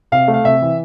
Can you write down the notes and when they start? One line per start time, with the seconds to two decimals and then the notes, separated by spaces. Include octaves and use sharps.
0.12 C3 F5
0.28 A3
0.34 F5
0.44 C3 E5
0.62 E3